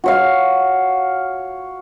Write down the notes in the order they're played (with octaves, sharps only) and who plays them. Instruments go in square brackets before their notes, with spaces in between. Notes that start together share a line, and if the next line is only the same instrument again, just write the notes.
[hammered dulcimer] F#4 C#5 F5